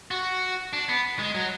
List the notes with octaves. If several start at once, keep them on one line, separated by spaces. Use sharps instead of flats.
F#4
D4
B3
G#3
F#3